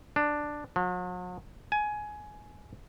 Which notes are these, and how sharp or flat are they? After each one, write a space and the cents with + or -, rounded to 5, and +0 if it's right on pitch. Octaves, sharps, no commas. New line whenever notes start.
D4 +5
F#3 -45
G#5 +15